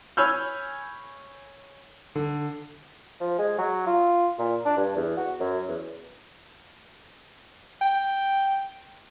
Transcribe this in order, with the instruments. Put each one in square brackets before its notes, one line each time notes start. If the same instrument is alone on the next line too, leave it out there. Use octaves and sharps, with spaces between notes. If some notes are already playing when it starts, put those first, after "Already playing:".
[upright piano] C#5 G#5 B5 E6 F6 G6
[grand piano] D3
[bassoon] F3
G#3
F#3
F4
A#2
D4
G2
E2
F#4
F#2
E2
[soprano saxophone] G5